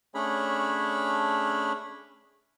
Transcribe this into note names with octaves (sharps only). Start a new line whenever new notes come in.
A3 C#4 D4 G#4 C#5 B5